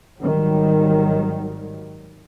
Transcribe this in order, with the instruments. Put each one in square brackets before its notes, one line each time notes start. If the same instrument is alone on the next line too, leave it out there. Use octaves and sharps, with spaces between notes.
[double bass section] G#1 G#2 D#3 F#3 G3